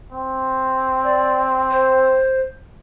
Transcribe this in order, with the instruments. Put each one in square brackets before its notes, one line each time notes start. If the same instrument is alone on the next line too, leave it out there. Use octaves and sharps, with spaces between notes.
[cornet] C4
[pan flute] D5
C5